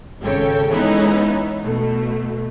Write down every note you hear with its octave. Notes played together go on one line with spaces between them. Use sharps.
G#1 C#3 A4 C#5 G5
E3 G#3 B3 C#4 D#4 E4
B2 A3